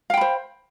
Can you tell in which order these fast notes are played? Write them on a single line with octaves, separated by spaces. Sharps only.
F5 G5 B5 C5